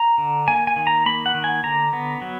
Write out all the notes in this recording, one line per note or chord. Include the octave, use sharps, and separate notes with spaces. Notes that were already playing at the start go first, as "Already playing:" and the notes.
Already playing: A#5
D3
A#3 G#5
G#5
D#3
A#5
A#3 B5
F#5
D#3
G#5
D3 A#5
B3
F#3